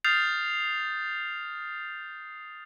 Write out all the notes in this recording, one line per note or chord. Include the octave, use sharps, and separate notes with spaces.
D#6 F6 G6 A6 C7 F7